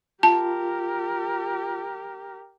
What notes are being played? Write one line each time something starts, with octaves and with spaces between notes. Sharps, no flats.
F4 G4 A#4 A5